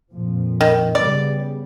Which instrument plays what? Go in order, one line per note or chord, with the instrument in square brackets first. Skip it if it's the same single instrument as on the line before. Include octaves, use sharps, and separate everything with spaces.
[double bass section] F2 A#2 F3
[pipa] D#3
[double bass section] C#3 G3 B3 [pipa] D5